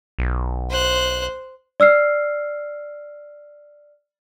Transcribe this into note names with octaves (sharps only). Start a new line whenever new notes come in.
B1
C5 F#6
D5 E6 F6 C7